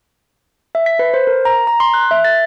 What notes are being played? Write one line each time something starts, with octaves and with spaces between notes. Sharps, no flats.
E5
B6
B4
C5
A#4
A#5
A#5
C6
F#6
E5
A6